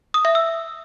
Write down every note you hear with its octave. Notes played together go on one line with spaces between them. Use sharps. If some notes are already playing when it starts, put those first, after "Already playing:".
D#6
E5
E6